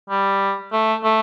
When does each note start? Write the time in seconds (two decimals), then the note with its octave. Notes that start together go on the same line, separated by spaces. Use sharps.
0.10 G3
0.72 A3
1.04 A3